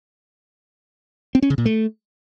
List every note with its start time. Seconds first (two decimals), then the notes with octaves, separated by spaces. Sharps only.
1.35 C4
1.42 C#4
1.50 C#3
1.58 A#2
1.66 A3